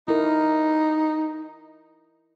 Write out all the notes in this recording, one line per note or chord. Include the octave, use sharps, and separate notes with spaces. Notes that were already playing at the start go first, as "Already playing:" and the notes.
D#4 E4 A#4